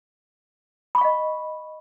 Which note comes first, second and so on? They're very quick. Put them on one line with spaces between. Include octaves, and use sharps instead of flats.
B5 C#6 F5 D#5